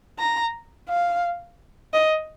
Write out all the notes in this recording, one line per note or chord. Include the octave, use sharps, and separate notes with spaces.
A#5
F5
D#5